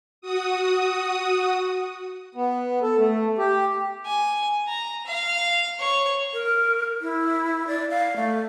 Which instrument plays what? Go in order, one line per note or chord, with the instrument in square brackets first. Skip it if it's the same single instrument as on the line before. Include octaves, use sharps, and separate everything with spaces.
[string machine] F#4 D#6
[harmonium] B3
A4
A3
G4
[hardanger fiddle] G#5
A#5
F5
C#5
[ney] A#4
E4
D5
F5
A3